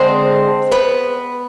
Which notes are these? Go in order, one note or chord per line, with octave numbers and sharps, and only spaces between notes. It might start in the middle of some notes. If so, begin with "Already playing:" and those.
Already playing: D3 G#3 C4 C5
B3 B4